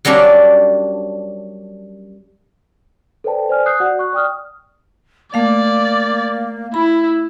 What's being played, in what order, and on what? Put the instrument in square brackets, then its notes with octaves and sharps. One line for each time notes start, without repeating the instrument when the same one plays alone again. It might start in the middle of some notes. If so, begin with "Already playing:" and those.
[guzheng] F#3 G3 A#3 C#4 D4
[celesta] A4 B4 C5 D5 G5 A5
C5 D5 G#5 F6
D#6 F#6 G6 C7
F#4 D5 F#5
C#6 F#6
D5 G5 D#6 F6
[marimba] A3 F5 [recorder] A#3 [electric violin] D5
[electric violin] E4 [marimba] B5